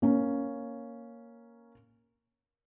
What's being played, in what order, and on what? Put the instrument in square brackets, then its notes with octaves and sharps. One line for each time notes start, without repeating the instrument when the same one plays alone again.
[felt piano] A#3 C#4